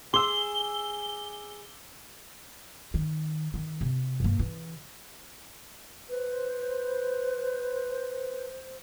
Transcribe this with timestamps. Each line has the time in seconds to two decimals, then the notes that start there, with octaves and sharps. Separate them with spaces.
0.14 G#4 C6 D6 E6 G7
2.94 D#3
3.54 D#3
3.81 C3
4.20 G2 A#3
4.39 C#3 E3
6.09 B4 C5